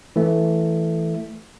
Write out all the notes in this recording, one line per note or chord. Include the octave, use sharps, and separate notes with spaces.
E3 A3